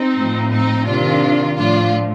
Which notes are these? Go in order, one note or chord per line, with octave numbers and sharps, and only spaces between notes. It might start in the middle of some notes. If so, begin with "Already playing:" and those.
Already playing: C4 D#4
A2 F3
C4 D#4
C3 D#3 D4 F4
A2 F3 D4 F4